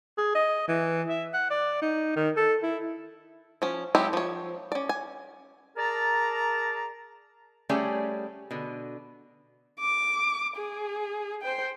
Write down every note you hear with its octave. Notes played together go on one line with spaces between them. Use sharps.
G#4
D#5
E3
E5
F#5
D5
D#4
D#3
A4
E4
F3 C#4
F#3 G#3 C4 E4 G4
F3 C#5
C#4 D5
G#5
G#4 A#4 D5 A5 A#5
G3 A3 C#4 G#4 C#5 D5
B2 D3
D6
G#4
C5 G5